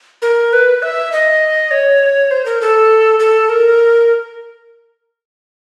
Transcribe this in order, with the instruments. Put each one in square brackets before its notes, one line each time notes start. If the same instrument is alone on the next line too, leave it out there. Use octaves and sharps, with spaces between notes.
[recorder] A#4
B4
E5
D#5
C#5
C5
A#4
A4
A4
A#4